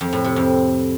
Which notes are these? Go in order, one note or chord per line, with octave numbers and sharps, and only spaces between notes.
F2
A2
C3
F2